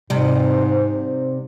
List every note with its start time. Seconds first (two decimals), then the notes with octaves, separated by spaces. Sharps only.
0.10 G#2 C3 G3